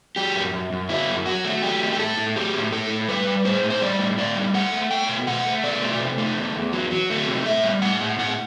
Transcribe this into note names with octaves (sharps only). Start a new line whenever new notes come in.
F#3 G4
F#2
F#2
F#2
F#3 E4
F#2
F#3 F#4
A3
F#3 G4
A3
G4
A2 A4
A2
F#3 G4
A2
A2 A4
A2
G3 B4
G3
A2 C5
A2
C5
G3 D5
A2
A2 D5
G3
A3 F#5
A3
A3 G5
B2
A3 F#5
A3
B2 D5
A3
C3
A3
E2
E2
F#3
F#3
A3
C3
A2 E5
G3
A2 F#5
A2
A2 F#5